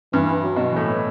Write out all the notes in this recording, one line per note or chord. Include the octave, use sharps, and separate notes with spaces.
G2 E3
F#3
B2
E3
A2